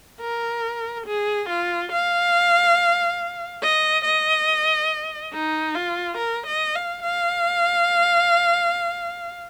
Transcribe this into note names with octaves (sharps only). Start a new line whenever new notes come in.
A#4
G#4
F4
F5
D#5
D#5
D#4
F4
A#4
D#5
F5
F5